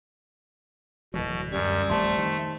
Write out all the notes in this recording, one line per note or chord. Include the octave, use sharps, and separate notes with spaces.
D1 B2 E3 F#3
F#2 G3
A1 F2 A3 C5 A5 C6
D#3